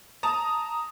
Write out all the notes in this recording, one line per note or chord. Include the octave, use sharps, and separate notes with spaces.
A5 A#5 D#6